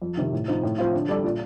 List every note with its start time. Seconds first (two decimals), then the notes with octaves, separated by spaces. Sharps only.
0.02 F2
0.17 C3 D#3
0.32 A2
0.48 F3 C4 D#4
0.63 A2
0.78 F3 C4 F4
0.93 D3
1.09 G3 D4 A4 D5
1.24 A#2